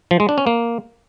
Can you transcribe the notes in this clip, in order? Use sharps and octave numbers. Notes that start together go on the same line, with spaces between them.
F3
G#3
D4
C#4
A#3